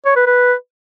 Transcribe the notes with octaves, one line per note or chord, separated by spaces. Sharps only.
C#5
B4
B4